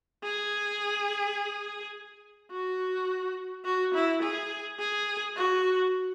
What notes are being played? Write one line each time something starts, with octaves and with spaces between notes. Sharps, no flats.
G#4
F#4
F#4
E4
G#4
G#4
F#4